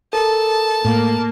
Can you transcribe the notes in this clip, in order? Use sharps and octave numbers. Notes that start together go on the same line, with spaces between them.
A4 A#4 A5
A2 A#3